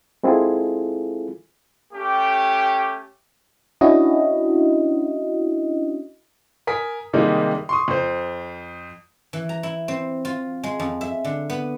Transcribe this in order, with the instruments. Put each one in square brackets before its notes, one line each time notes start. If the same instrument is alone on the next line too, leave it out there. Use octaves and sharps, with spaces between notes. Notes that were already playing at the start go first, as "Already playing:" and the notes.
[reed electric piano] G#3 C4 E4 F4 G#4 A4
[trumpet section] A3 C#4 G4
[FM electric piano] C#4 D4 E4 F#4 D#5
[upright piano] A#4 G#5 D#6 B6
C3 D#3 G3 G#3 A#3 D#4
C6 C#6 D#6
F2 C5
[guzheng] E3
A#5
E4
C4
F4
G#3
F2
E5
D3
B3